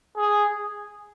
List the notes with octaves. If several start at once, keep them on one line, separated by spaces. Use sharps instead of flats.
G#4